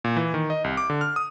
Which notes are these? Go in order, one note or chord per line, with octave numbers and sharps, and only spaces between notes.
A#2
E3
D#3
D#5
C2
D6
D3
F6
D#6